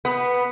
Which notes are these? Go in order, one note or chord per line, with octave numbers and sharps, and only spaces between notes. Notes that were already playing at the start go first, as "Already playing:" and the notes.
B3